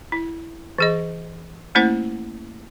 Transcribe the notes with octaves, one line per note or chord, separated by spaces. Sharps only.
E4
E3 G#4 D#5
A3 A#3 C#4 E4 C5 F#5